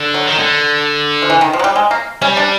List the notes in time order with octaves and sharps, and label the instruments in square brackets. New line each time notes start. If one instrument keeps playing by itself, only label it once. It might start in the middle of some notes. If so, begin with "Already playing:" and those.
Already playing: [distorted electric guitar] D3
[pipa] F#3
[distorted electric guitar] D#3
D3
[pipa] F3
E3
D#3
F3
F#3
G3
G#3
A#3
[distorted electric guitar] G3 [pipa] C#4
[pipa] D4